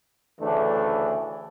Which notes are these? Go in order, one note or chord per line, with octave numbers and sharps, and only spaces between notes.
D2 C#3 E3 A3 D4